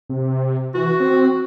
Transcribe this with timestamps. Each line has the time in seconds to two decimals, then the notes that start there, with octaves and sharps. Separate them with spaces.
0.10 C3
0.75 E3 F#4
1.00 C4